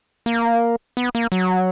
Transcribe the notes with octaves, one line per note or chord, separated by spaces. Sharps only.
A#3
B3
A#3
F#3